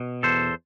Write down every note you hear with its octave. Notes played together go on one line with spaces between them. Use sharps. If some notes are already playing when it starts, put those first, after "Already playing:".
Already playing: B2
E2 A4 C5